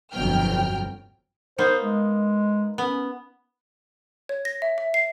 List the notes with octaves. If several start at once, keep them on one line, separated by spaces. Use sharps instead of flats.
G1 F2 B2 F#3 G5 F6
A#3 B3 D#4 C5
G#3
B3 C#4
C#5
A#6
E5
E5
C7